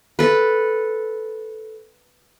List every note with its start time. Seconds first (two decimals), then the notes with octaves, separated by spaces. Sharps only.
0.19 A4 B4